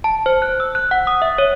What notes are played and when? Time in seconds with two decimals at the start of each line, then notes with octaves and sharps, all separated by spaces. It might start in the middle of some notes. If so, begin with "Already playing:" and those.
0.04 A5
0.26 C5
0.42 F#6
0.60 E6
0.75 F#6
0.91 F#5
1.07 D#6
1.22 E5
1.38 C#5